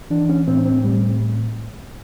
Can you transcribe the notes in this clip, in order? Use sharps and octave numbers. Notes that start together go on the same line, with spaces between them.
E3 D4
C#4
A2 C4
C4
A2 G3